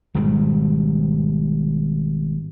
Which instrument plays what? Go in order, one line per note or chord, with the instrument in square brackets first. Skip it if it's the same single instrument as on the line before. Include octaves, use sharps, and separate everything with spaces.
[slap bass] G#1 G#2 B2 G3